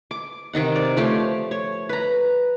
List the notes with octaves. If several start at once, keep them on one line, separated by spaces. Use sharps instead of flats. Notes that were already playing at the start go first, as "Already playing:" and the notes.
D6
C3 D#3 D#4 F#5
D5
F3 A3 G4 C#5
C#5
B4 A#5